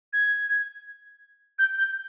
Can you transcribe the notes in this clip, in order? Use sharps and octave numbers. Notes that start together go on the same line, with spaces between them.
G#6
G6
G6